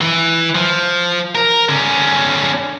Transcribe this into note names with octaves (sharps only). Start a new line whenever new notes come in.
E3
F3
A#4
D3 C#4